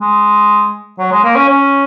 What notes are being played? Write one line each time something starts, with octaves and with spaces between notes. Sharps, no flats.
G#3
F#3
G#3
A#3
C#4
C#4